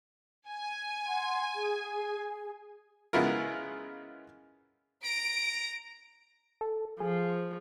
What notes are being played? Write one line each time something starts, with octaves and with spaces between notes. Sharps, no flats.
G#5
F#5 C6
G#4
C#3 G#3 B3 E4 F4 A#4
A#5 D7
A4
F3 G#4